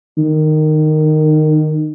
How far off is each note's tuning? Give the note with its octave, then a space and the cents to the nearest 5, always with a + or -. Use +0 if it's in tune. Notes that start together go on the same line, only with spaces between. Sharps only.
D#3 -15